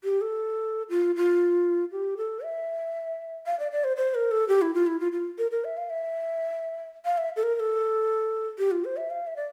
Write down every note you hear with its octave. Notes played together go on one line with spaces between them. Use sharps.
G4
A4
F4
F4
G4
A4
E5
F5
D5
D5
C5
C5
A#4
A4
G4
E4
F4
E4
F4
F4
A#4
A#4
E5
F5
E5
F5
E5
A4
A#4
A#4
A4
G4
F4
C5
E5
F5
E5
D5